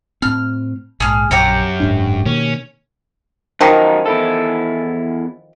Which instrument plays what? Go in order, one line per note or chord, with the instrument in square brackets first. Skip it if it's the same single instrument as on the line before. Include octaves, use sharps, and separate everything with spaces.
[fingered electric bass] A2 C4 [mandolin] F6
[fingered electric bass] A#1 G#2 [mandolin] G#4 F6
[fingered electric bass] A#1 [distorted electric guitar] F#2 [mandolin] G4 C#5 A#5
[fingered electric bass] D1 G#2 D4
[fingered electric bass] B2 D#3 A#3 [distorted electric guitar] C#4
[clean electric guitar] F#2 D#4 [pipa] D#3 F3
[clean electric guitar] E2 E4 A4